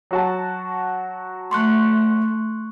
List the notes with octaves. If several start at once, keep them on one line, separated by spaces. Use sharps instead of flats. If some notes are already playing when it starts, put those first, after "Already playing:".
F#3 F#4 A5
A3 C6 C#6 F#6